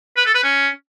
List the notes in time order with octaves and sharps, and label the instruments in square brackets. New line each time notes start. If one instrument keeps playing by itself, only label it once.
[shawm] B4
A4
B4
C#4